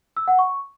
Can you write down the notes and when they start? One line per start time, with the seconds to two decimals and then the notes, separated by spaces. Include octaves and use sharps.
0.17 E6
0.28 F#5
0.39 C#6